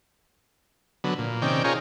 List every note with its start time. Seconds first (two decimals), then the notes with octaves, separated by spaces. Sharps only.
1.04 D3 F#3 B3
1.18 A#2
1.42 C3 D#3 C#4 D5 G5
1.64 C#4 D#4 F4 G#4 A#4 C#5